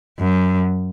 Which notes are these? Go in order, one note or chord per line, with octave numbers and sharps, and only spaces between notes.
F#2